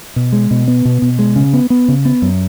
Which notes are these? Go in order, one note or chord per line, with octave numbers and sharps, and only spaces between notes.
B2
G#3
B2
B3
B2
B2
G#3
C#3
B3
B3
C#3
B3
F#2